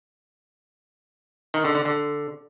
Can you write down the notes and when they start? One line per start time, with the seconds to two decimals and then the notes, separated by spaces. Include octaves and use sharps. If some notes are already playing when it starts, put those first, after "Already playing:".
1.54 D#3
1.64 D3
1.75 D3
1.85 D3